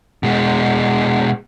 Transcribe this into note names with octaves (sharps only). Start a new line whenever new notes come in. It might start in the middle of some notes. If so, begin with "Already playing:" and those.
B2 G#3